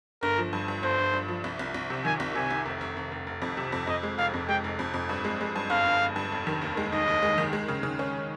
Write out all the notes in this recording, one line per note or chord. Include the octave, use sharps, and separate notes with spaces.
G1 A#4
F3
G2
G2
G1 C5
G1
G2
F3
C2
C2
C2
C3
D#3 G#5
C2
C3 G#5
C2
F1
F1
F1
F1
F1
F2
C3
F2
F2 D#5
G#3
F1 F5
F2
G#3 G5
F1
F2
F2
G2
G#3
G#3
G2
G1 F5
G1
G1
G2
F1
D#3
D#2
G#3
D#2 D#5
D#2
G#3
D#3
G#3
C#3
C#3
C#4